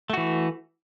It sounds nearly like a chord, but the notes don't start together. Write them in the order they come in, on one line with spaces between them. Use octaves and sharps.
A3 F#4 E3